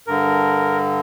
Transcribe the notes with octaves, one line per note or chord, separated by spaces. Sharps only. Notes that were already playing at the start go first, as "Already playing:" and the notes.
G2 D3 A#4